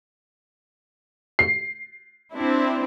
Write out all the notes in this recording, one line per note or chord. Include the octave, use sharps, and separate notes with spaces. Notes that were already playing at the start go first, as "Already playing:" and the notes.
C7
C4 D4 E4